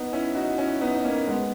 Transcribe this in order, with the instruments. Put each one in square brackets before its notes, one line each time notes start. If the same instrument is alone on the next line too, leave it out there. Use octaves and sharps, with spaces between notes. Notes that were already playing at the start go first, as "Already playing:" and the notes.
Already playing: [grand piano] B3 D#4
C#4 E4
D#4 F#4
C#4 E4
B3 D#4
D#4
A#3 C#4
G#3 B3